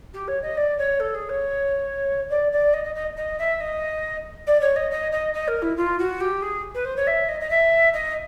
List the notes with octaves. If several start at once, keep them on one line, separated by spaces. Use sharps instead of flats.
G4
C#5
D#5
D5
C#5
A4
G#4
C#5
D5
D5
D#5
D#5
D#5
D#5
E5
D#5
D5
C#5
D#5
D#5
D#5
D#5
A#4
E4
F4
F#4
G4
G#4
B4
C5
C#5
E5
D#5
D#5
E5
D#5